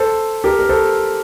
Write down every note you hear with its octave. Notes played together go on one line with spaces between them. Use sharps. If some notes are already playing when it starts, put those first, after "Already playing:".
Already playing: A4 C5
G4 A#4
A#4
A4 C5